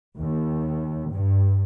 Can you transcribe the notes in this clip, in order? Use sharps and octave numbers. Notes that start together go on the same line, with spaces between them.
D#2
G2